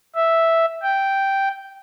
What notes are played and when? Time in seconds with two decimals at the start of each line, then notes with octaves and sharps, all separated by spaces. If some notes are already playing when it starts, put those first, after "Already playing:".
0.15 E5
0.82 G5